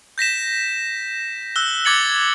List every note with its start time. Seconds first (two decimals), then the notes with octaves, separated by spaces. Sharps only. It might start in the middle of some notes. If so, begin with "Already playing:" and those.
0.18 G6 A#6 B6 E7
1.56 E6 F#6 G7
1.85 D6 G#6 A6 C#7 F#7